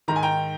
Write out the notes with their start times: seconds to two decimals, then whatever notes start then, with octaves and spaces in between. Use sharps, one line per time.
0.08 G#2 D#3 A#5
0.16 G#5
0.23 G5 A#5